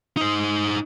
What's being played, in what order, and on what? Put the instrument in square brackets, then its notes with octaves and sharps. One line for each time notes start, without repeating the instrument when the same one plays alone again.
[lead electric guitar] D#4 C5